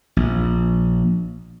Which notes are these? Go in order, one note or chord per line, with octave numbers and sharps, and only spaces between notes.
A#1